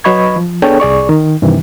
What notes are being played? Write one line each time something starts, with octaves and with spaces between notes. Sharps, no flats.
F#3 B4 D#5 B5 C#6 G#6
F3
B3 D4 G#4 A4 C#5 G5
C2 G#4 D5 C#6
D#3
G2 C3 D#3 E3